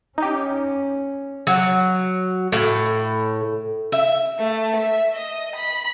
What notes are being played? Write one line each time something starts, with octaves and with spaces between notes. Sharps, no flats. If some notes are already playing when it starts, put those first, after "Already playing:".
C#4 D#4 G4
F#3
A2
E5
A3
E5
D#5
B5